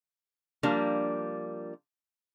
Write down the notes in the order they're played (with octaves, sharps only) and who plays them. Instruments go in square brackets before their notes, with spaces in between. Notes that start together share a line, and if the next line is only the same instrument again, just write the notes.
[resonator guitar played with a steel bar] F3 G3 A#3 D4